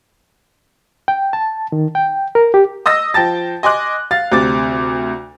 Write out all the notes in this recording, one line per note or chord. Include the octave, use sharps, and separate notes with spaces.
G5
A5
D#3
G5
A#4
G4
D#5 D#6 E6 A#6
F3 G5 A5 A6
D#5 G#5 C6 D6 F#6
F5 A6
D2 C3 D6 A6